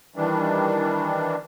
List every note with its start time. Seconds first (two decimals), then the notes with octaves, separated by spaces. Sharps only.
0.16 D#3 E3 G3 D4